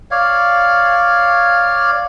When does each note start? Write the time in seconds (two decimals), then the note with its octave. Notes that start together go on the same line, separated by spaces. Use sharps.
0.11 C#5 D5 F5